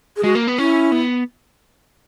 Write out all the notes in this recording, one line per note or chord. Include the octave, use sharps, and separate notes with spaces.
G#4
G#3 F#4
A#3
B3
C#4 E4
B3